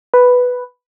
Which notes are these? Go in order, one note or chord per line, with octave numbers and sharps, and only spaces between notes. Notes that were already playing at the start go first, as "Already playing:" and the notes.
B4